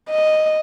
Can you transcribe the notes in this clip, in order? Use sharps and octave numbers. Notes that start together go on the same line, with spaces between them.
D#5